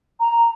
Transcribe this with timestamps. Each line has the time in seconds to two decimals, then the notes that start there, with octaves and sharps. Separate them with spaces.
0.20 A#5